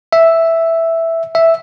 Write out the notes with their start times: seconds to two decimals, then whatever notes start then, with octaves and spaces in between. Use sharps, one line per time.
0.13 E5
1.35 E5